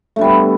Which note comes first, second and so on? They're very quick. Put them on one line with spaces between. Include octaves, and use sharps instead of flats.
A3 D3 G3 B3